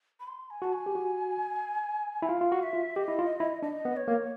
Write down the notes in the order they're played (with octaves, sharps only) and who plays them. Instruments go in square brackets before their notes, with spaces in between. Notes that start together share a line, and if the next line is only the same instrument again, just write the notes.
[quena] B5
C6
G#5
[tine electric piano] F#4 [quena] A5
[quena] G#5
[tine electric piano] G4
F#4
E4
[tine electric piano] F4 [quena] F5
[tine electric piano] F4
F#4
[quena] E5
[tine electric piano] F4
[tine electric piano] G4 [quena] D#5
[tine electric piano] E4
F4
E4
[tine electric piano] D4 [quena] D#5
[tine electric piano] B3
[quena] C#5
[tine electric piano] A#3